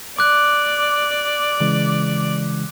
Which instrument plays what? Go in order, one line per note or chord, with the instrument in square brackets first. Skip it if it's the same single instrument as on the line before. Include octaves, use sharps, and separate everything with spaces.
[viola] D5 [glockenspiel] D6 F#6
[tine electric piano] C#3 E3 G#3